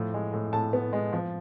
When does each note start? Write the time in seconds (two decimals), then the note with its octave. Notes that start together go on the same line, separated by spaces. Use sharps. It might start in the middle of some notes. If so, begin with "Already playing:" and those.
Already playing: A2 F3
0.14 G#3
0.33 A2
0.53 A2 A5
0.73 B3
0.93 G#3
1.12 F3